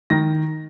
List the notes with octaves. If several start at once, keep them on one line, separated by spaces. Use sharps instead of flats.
D#3 A#6